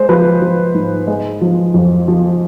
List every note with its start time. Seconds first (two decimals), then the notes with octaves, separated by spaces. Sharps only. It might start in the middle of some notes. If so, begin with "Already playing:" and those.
Already playing: G#3 C5
0.09 F3 B4
0.42 F3
0.74 G#2
1.07 G#3
1.41 F3
1.74 F2
2.08 F3